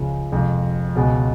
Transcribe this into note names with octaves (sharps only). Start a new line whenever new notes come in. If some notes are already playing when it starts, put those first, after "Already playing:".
Already playing: C#2 C#3 F3 G#3
F2 C3 F3 G#3
C#2 B2 G#3